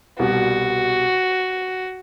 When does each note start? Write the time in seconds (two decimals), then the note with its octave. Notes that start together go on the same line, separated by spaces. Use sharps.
0.19 C2 B2 G3 F#4